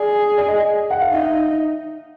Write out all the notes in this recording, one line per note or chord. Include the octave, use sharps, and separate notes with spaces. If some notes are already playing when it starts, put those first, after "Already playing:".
Already playing: G#4 D5
D5
D#5
F#5
F5
D#4 E5